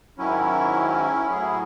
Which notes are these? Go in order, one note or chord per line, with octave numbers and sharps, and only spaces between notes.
G#2 D#3 F#3 C#4 E4
A2 F#3 E4 G#4